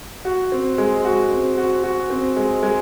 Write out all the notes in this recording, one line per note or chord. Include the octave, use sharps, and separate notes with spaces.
F#4
C4
G#3
F#4
C4
F#4
F#4
C4
G#3
G#3